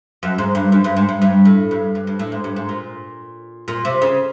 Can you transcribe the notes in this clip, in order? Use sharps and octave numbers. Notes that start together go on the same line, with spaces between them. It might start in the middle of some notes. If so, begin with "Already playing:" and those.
F#2
G#2
G2
F#2
G2
G#2
G2
G2
A2
G2
G2
G2
A2
G#2
G2
G#2
A#2
A#2
C3
C#3